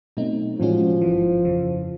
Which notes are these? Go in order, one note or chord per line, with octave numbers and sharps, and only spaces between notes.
B2 F#3 A3 C4 D#4
A2 E3 F3 G#3 C#4 F#4
G#1 G2 E3
F2 C#3 E3